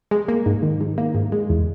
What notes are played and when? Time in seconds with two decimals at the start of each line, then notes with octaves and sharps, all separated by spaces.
0.11 G#3
0.28 A#3
0.46 G#2
0.63 D#3
0.81 G#2
0.98 A#3
1.14 G#2
1.32 G#3
1.49 E2